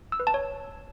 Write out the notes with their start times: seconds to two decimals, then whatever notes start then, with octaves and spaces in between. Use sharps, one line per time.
0.12 E6
0.20 B4
0.27 A5
0.34 C#5